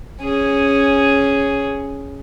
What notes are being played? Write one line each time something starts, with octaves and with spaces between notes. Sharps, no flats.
C#4 G#4